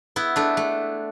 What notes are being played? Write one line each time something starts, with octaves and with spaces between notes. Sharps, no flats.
B3 E4
A3 D4
A3